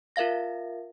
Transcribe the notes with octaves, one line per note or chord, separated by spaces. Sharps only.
F4 A#4 E5 F5 A#6